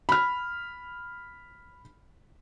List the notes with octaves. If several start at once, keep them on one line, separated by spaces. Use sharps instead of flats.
B5 F6